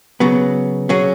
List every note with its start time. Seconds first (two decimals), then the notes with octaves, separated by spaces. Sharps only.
0.20 C#3 F#3 B3
0.89 F#3 C#4 G#4